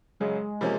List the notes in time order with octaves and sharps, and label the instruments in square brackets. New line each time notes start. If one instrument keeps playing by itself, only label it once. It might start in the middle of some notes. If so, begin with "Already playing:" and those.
[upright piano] F#2 C#3 F#3 [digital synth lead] G#3
[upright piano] C3 F3 A#3 C#4